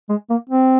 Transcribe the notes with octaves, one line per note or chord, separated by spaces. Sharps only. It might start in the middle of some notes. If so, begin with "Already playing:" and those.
G#3
A#3
C4